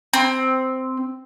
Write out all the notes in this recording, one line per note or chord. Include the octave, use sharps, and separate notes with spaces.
C4